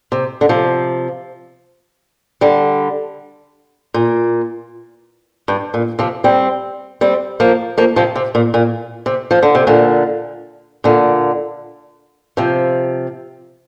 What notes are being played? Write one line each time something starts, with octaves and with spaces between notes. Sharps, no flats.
C3
D3
C3 F3
D3 G3
A#2
G2
A#2
C3 F3
G3 C4
G3 C4
F3 A#3
F3 A#3
C3 F3
C3
A#2
A#2
C3
F3
D3
C3
A#2 D3
A#2 D3
C3 F3